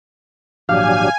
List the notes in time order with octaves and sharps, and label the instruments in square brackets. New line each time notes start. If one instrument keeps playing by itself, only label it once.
[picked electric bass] G#1 A#2 F3 [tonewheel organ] F#3 D4 G4 [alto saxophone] F5 [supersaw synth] G#5